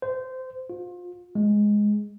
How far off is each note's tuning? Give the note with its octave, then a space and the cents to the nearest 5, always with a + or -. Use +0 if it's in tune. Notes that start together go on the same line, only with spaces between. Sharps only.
C5 -20
F4 +30
G#3 +0